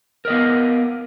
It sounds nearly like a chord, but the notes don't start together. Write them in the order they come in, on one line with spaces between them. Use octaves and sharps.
A#4 D#5 B3 F5